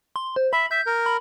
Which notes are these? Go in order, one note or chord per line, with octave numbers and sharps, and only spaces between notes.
C6
C5
E5 B5
E5 G6
A#4
B5